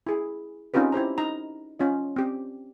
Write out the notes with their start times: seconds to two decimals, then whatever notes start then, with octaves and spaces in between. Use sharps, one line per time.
0.07 E4 G#4
0.74 C4 C#4 D#4 F4 G4 B4
0.92 E4 G4 C5 A#5
1.18 D#4 A#5
1.79 C#4 F4 D#5
2.16 C4 G4